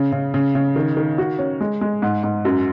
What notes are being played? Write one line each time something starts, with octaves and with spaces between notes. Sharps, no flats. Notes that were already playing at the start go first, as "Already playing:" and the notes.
Already playing: C#3
C#3
C#3
C#3
D#3
D#3
F#4
C#4
G#3
G#3
G#2
G#2
F#2